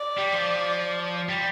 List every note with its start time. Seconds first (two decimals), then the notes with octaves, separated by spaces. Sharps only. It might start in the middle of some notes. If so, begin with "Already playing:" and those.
Already playing: D5
0.17 G3
0.33 F3
1.29 G3